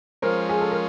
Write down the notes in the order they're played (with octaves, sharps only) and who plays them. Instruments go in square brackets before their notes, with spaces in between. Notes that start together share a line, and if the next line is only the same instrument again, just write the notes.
[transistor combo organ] F3 G#3 C#4 [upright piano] A#4 C5
[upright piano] G#4
A4
A#4